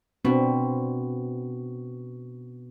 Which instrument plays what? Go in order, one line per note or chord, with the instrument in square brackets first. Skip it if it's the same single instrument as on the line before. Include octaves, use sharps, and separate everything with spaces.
[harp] B2 [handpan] C4 D4